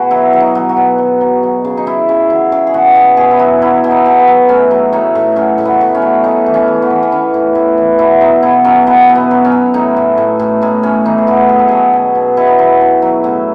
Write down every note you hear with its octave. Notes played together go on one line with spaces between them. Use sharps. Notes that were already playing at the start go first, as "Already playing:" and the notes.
Already playing: B2 F#4 G#4
F#3 E4
F#3
D#4
F#3
F#4
B2
F#3
F#3
F#3
C#3
D#4
C#3 E4
C#3
F#3 E4
C#3
G#4
B2 F#4
B2 G#4
B2 G#4
E4
F#3 F#4
F#3 E4
B2
D#4
B2
B3
F#3
A2 C#4
F#3
A2 D#4
A2
F#3 C#4
A2
B3
A2
C#4
F#3
A2 D#4
E3
C#4
E3
B3
E3
B3
E3 C#4
A2
A2
E3
B2 E4
F#3 D#4
B2 E4
F#3 C#4
B2 B3
B2
B3
F#3
C#4
F#3
A2 D#4
A2
A2
A2
A2 D#4
A2 C#4
E3 D#4
G#4
A2 F#4
F#3 G#4
A4
F#3 G#4
B2
B2
B2 E4
D#4
F#3 E4
B2
F#3
A2